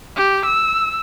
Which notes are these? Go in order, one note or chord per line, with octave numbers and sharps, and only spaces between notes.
G4
E6